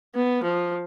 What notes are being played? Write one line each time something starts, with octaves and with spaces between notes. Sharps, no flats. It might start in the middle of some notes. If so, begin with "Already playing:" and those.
B3
F3